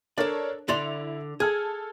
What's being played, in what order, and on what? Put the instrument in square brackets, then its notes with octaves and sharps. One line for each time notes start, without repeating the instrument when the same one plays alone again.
[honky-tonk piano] D4 A#4 C#5 [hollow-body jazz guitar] A4 D5
[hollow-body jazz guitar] D3 D5 C6 [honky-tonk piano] E4 F7
[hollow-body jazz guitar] G#4 [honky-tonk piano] A4 F6 G#6